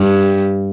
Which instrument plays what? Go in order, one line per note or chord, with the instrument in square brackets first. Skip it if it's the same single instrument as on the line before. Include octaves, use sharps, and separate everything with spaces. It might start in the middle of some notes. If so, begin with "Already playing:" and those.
Already playing: [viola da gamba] G2